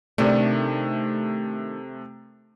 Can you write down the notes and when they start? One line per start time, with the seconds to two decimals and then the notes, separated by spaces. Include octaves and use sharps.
0.18 C3 D#3 A3 D4